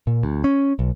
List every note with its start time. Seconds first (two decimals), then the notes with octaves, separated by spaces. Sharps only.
0.07 A#2
0.23 D2
0.44 C#4
0.79 B1